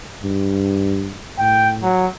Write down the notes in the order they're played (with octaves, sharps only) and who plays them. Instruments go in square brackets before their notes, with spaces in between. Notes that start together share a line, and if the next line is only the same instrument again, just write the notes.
[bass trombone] G2
[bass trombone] A2 [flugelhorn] G5
[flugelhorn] F#3